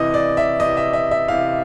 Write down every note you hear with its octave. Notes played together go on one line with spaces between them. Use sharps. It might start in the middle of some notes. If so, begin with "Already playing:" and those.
Already playing: C3 E3 D#5
D5
E5
C3 E3 D#5
E5
E5
E5
C3 E3 F5